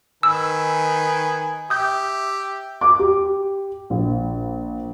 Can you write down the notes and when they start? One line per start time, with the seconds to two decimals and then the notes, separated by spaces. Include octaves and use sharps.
0.23 D#3 B4 G#5 E6
1.70 G4 E5 D#6 G6
2.81 D6
2.99 G4
3.90 A#1